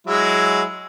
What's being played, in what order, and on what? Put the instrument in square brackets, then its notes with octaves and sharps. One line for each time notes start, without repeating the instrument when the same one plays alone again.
[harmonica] F#3 G#3 E4